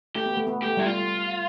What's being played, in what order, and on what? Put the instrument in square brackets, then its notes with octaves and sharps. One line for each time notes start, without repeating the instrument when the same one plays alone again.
[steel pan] A3 [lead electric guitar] G4
[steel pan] B3
A3
B3
[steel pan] A3 [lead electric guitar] G4
[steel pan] G3 [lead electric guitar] E4
[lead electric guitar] F4